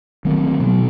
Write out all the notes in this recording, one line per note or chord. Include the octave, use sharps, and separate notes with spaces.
D#3 F#3 A3 C4
B2 F#3